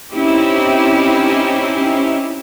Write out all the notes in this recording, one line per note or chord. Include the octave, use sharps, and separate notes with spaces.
C4 C#4 D#4 E4 G4